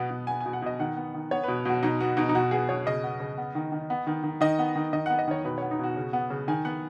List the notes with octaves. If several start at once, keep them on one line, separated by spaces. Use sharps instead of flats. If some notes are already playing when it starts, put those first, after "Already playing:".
Already playing: B2 B3
B2
B3 G#5
B2 G#5
F#5
B2 D#5
D#3 F#5
B3
D#3
B3 C#5
B2 B4
B2 F#4
B2 D#4
B3 F#4
B2 D#4
D#4
B2 F#4
B3 G#4
B2 C#5
C#3 D#5
B3
C#3
B3
D#3
D#3
B3
D#3
D#3
D#3 D#5
B3
D#3
D#3 D#5
B3 F#5
D#5
D#3 C#5
B2 B4
B3 C#5
D#4
B2 F#4
C#3
B3
C#3
D#3 G#5
B3 F#5